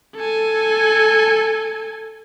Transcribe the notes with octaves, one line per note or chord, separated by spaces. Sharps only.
A4 G#5